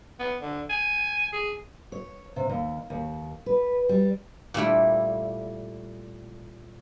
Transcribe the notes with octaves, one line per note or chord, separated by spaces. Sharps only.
B3
D3
G#5
G#4
C#5
C3
D#2
D#2
B4
G3
A#2 G3 A3 E4